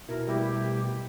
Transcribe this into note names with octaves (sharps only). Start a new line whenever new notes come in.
B2 E4 A#4
G3 A3 E4 G4